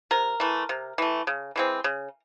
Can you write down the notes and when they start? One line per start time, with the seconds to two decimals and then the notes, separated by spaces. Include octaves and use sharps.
0.11 C3 A#4
0.40 E3 A3
0.69 C3
0.98 E3 A3
1.27 C#3
1.56 E3 G#3 C4
1.84 C#3